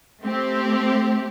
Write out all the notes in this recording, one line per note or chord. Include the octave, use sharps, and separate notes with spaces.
A3 C4 G4